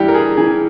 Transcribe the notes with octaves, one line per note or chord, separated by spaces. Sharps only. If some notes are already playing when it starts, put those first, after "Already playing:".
Already playing: G2 E3 E4 G4
A#4
G#4
E3 G#4